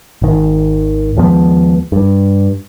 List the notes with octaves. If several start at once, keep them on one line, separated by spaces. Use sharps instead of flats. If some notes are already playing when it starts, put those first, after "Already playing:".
G#1 D#3
D#2 F3 G#3 B3
G2